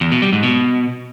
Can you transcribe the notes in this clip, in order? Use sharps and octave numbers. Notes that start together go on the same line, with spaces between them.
E2
B2
G3
G#2
B2